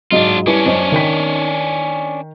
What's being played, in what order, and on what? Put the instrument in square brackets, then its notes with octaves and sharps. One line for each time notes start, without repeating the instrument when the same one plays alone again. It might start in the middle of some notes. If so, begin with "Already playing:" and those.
[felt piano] G#2 F#3 D#5 [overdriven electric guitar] D4 F4
[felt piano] G3 E4 B4 [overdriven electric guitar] C#4 D4
[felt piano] F#2 C5 D#5
D#3 G5 B6